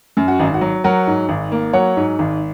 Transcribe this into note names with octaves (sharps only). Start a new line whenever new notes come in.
F#2
F#4
G#1 D#4
F#4
F#3
F#3 F#4 A#4
G#2
G#1
A#3
F#3 C#5 F#5
G#2
G#1